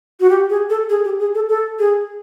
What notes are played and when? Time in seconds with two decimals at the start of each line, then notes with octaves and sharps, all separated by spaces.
0.20 F#4
0.30 G4
0.50 G#4
0.70 A4
0.90 G#4
1.04 G4
1.19 G#4
1.35 A4
1.49 A4
1.79 G#4